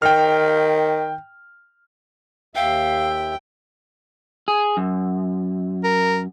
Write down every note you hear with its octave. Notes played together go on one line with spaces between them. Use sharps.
D#3 G5 F6
D#2 E5 F5 G5
G#4
F#2
A#4